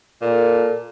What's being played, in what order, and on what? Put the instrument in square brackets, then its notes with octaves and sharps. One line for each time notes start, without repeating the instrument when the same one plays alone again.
[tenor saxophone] A#2 [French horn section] A4 A#4